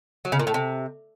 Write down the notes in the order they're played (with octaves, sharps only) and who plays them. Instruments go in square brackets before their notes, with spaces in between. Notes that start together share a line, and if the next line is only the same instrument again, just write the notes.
[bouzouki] F#3
C#3
A#2
A2
C3